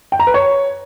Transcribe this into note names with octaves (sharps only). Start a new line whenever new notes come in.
G5
A#5
B4
C#5